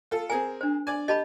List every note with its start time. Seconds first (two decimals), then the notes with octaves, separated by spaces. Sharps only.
0.11 F4 A4
0.30 C4 G#4 A#4 G#5
0.61 D4 C5
0.87 D5 G#5
1.08 G4 D#5 A5 B5